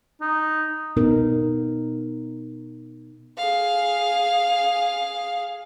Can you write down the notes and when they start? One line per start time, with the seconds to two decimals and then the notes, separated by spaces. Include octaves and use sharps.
0.21 D#4
0.97 B2 B3 D#4 A#4
3.37 G#4 F5